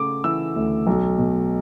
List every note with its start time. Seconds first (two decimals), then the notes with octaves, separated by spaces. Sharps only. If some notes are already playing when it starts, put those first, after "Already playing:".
Already playing: C#3 A3 D6
0.24 E3 E6
0.56 D2
0.87 B1
1.18 B2